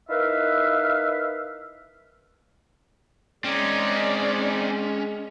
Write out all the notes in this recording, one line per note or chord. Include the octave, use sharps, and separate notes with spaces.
D#4 E4 A#4 B4 E5 F5
G#3 C4 C#4 D#4 D5